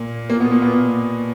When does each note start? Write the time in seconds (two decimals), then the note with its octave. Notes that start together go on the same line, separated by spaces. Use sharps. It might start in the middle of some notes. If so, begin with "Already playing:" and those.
Already playing: A#2 A#3
0.30 A#2 A#3
0.40 B2 B3
0.51 A#2 A#3
0.62 B2 B3